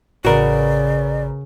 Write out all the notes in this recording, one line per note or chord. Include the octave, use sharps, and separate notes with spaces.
A1 C#3 F#4 A#4 B4 D5 A#5